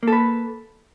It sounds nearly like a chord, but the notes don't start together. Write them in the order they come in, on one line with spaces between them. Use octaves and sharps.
A#3 A4 B4